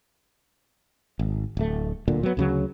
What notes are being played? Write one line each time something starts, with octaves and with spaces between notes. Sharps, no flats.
G#1
D1 A3
D1 A#2 D3
F#3 B3
D2 C#3 F#3